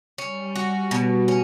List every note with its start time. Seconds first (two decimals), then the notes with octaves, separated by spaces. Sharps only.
0.18 G3 C#4
0.56 F#4
0.91 B2
1.28 C#4